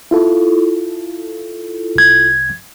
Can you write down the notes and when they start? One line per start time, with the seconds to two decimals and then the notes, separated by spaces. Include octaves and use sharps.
0.11 E4 F4 A4
1.96 C2 G#6